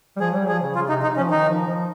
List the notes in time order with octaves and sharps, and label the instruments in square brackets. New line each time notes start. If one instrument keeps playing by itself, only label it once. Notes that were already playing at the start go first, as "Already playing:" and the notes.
[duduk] G3
[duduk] F3 [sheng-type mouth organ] G#4
[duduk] G3
[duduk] F3 [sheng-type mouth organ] G#4
[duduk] C#3
[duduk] C#3 [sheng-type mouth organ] F4
[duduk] C3 [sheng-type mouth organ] D#4
[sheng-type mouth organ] D#4
[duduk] F3 [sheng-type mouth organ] C#4
[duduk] D#3 [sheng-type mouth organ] D#4
[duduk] F3
F3